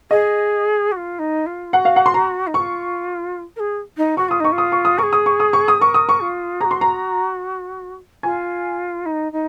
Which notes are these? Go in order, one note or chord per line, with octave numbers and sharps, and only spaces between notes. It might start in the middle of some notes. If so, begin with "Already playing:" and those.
G#4 D#5
F#4
F4
D#4
F4
F#4 F#5
F5
F#5
C6
A#5
D#4
F4 F#4 C#6
A#4
G#4
D#4
F#4 C#6
F4 D#6
D#4 C#6
F4
D#6
C#6
D#6
G#4 A#4 C#6
D#6
C#6
D#6
C#6
D#6
A#4 C#6
D#6
C#6
F4
F#4 G#4 A#5
C6
A#5
F4 G#5
D#4
D#4